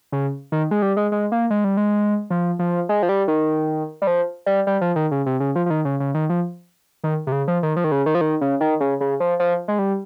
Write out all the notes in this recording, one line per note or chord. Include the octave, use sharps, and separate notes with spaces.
C#3
D#3
G#3
G3
G#3
G#3
A#3
G#3
G3
G#3
F3
F3
G#3
F3
G3
D#3
G3
F3
G3
G3
F3
D#3
C#3
C3
C#3
F3
F3
D#3
C#3
C#3
D#3
F3
D#3
C3
C#3
F3
D#3
F3
D#3
C#3
D#3
F3
D#3
C#3
D#3
C#3
C#3
F3
F3
G#3
G3